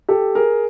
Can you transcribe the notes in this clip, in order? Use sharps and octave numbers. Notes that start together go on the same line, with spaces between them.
G4 A4
G#4 A#4